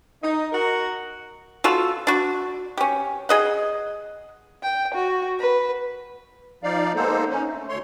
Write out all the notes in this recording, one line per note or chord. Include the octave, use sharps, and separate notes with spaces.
D#4
F#4 A#4
F4 F#4 A4
D4 F#4
C#4 G4
G#4 D#5 F#5
G5
F#4
B4
F3 D#4 D5 F5
G#3 A#3 B3 D#4 A4 C5
C#4 D#4
A3
D2 A3 C#5 C6